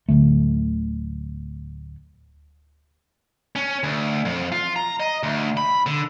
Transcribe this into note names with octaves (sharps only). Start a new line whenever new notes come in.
D1 D#2 D3 A3
C#4
D2
F2
F4
A#5
D#5
D2
B5
D3